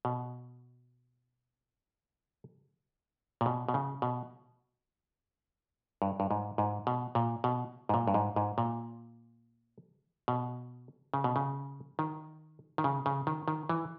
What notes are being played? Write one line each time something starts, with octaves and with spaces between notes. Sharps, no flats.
B2
A#2
B2
B2
C#3
B2
G2
G2
G#2
G#2
B2
A#2
B2
G#2
A#2
G2
G#2
G#2
A#2
B2
C#3
B2
C#3
D#3
D#3
C#3
C#3
D#3
D#3
E3